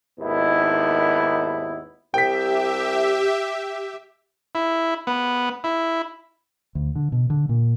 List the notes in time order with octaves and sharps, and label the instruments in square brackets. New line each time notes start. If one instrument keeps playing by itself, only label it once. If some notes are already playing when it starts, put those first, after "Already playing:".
[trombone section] G#1 D#2 B3 E4
[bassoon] C2 [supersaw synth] G4 E5 [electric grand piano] G5 B6
[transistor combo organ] E4
B3
E4
[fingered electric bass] D2
D3
B2
D3
A#2